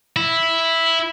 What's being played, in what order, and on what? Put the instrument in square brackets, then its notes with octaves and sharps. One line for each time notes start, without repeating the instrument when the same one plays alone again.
[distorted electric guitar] E4